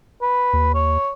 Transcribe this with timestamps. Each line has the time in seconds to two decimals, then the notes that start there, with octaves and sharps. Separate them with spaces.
0.22 B4
0.53 D#2
0.74 C#5